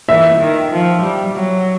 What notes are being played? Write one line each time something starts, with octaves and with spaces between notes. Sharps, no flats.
E3 E5
D#3
F3
G3
F#3